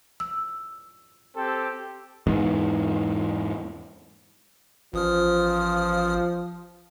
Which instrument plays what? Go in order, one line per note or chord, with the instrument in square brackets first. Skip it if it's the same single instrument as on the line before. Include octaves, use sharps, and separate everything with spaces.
[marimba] E6
[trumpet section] C4 G4 A4
[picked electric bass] E2 G#2
[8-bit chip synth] A1 D#6 F6 [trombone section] F3